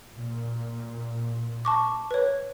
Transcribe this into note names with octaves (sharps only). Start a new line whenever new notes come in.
A#2
A5 C#6 D6
B4 C#5